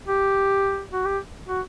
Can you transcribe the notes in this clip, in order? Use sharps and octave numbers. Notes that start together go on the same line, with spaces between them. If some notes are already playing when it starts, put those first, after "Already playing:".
G4
F#4
G4
F#4